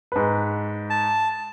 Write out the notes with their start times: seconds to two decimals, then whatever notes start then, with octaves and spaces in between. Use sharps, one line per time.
0.12 G#2 B4
0.90 A5